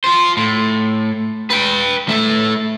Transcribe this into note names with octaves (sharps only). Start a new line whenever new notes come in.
F4 C5
A2
B4 G5
A3 E4